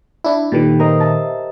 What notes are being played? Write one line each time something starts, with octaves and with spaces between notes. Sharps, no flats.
D4 E4
A#2 D#3 G4 A4 B4
A#4 C5 D#5
E5 A5